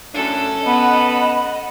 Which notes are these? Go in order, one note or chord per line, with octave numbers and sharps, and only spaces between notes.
F#2 A2 C#4 D4 A4
B3 D#5 F#5 B5